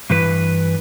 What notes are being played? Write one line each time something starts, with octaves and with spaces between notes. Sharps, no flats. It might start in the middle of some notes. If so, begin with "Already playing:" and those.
G2 E3 B4